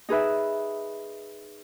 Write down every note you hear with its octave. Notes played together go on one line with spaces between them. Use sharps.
D#4 G#4 B4 E5